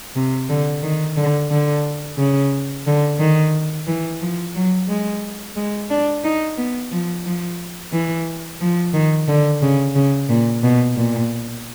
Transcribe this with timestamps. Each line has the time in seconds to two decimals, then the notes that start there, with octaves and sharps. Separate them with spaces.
0.16 C3
0.50 D3
0.83 D#3
1.17 D3
1.51 D3
2.18 C#3
2.86 D3
3.19 D#3
3.87 E3
4.20 F3
4.55 F#3
4.88 G#3
5.56 G#3
5.90 D4
6.24 D#4
6.58 B3
6.92 F3
7.25 F3
7.92 E3
8.61 F3
8.93 D#3
9.28 D3
9.62 C#3
9.95 C#3
10.29 A#2
10.64 B2
10.96 A#2